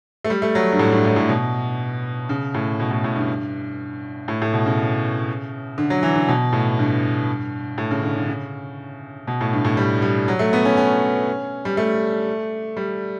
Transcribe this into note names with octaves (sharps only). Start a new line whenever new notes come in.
A3
G3
A3
F#3
G2
A2
G2
A2
A2
B2
C#3
A2
B2
A2
A2
G2
A2
A2
B2
C#3
D3
F#3
E3
D3
B2
A2
G2
A2
C#3
D3
D3
C#3
B2
A2
G2
A2
G3
G3
F#3
A3
B3
C#4
C#4
G3
A3
G3